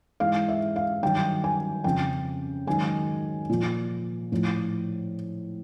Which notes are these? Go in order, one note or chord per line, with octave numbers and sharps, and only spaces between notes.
G#2 E3 F5
E5
F5
G2 D#3 F#3 G5
G#5
F2 C#3 F3 G5
G#2 D#3 F#3 G#5
A#2 F3
A2 F3